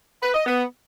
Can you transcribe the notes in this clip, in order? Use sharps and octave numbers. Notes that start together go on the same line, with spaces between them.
B4
D#5
B3